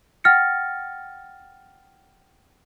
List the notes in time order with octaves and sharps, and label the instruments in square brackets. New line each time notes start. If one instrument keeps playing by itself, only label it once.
[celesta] F#5 G5 F6 A6 A#6 C#7